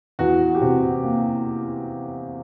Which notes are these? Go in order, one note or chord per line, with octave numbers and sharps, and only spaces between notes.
E2 F#4
G4
C3 F#4
A#3